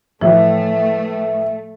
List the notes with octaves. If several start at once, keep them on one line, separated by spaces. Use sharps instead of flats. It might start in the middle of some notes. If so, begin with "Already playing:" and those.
A2 E3 F3 A3 E5